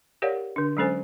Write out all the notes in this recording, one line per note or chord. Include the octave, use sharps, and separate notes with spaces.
G4 A#4 C#5 D5 F5 F#5
D3 D4
F#3 G#3 C#4 A4 C5 G#5